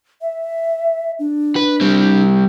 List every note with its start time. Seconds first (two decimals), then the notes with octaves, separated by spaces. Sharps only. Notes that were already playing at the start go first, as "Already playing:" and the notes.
0.21 E5
1.19 D4
1.56 B4
1.81 G3 C4